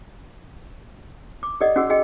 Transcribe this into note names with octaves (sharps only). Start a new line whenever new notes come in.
D6
G4 A4 D5 D#5 F#5
C#4 F#4 G#4 F#5 E6
F#4 G#4 D#5 G5